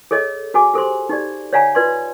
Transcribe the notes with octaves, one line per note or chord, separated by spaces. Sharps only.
G#4 A4 C#5 D#5
F#4 G#4 G#5 D6
G4 A4 C5 C6
D#4 G4 D5
C#5 D5 F5 F#5 G#5 A#5
F4 B4 D5 C6